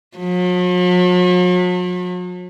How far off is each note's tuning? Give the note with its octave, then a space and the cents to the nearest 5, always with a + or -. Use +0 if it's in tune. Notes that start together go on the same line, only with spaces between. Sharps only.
F#3 -45